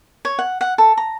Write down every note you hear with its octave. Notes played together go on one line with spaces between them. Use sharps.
C#5
F#5
F#5
A4
A#5